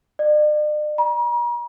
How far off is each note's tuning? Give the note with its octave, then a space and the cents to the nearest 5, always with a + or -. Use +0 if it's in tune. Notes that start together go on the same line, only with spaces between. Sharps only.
D5 +45
A#5 +45